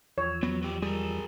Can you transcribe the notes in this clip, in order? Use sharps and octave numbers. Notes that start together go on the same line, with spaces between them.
E2 F3 C#5 E6
F#3 B3
F#3 G4
G3 G#4 A#4